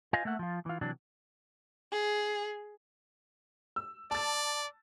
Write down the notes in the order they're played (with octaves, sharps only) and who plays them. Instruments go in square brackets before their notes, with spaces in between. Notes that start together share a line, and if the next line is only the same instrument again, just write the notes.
[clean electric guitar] F4 C5 D#5 F5 G#5
A3 A#3 E5 F#5
F3 F4
E3 F4
C3 E3 F#3 D4
[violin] G#4
[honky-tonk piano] E6
[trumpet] D5 [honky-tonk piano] A5 A6